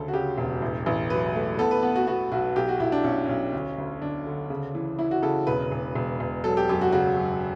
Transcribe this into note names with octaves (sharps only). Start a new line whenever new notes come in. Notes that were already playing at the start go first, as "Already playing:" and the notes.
Already playing: D2 C#3 A4
F#4
C#3 G4
E1
A1
A1
F#3 B4
A3
B3 A4
B4
B3
F#4
B3 F#4
B1 F#4
B1 G4
F#4
B1 E4
D4
B1 C#4
B1 C#4
D2
D2
D2 D4
D3
C#3
E3
E3 E4
F#4
C#3 A4
E1 B4
E1
E1
E1
F#3 A4
G4
F#2 G4
F#4
C#3 F#4
F#2